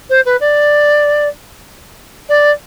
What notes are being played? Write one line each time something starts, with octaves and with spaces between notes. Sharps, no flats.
C5
B4
D5
D5